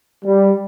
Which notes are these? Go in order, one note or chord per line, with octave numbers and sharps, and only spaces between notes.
G3